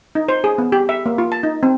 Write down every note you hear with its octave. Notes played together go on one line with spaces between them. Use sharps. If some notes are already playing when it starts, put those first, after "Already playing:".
D#4
C5
G#4
B3
G4
E5
A#3
F4
A5
D#4
C4